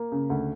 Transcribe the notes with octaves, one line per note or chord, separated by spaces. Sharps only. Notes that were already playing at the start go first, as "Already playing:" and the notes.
Already playing: A#3
C#3
D2